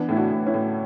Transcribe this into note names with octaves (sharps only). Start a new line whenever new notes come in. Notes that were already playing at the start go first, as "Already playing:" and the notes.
Already playing: E3 B3 D4
A2 E4
D4 F#4
A2
C#4 E4
A2